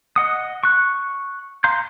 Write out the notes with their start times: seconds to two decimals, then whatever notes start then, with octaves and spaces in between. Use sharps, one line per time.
0.16 D#5 F#5 D#6
0.64 C#6 F#6
1.64 F5 A#5 C6 G6